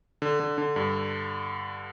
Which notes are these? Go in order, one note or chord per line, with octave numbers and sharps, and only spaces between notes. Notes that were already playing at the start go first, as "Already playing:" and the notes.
D3
D3
D3
G2